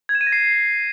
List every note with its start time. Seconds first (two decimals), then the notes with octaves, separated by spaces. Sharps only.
0.09 G#6
0.15 E7
0.21 D#7
0.27 A#6
0.32 C7